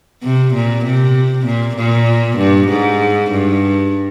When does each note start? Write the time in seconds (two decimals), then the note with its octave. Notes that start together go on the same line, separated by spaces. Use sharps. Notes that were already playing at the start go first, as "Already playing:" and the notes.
0.23 C3
0.54 A#2
0.85 C3
1.46 A#2
1.76 A#2
2.37 G2
2.68 G#2
3.31 G2